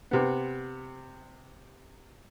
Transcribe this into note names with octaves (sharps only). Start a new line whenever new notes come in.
C3 B3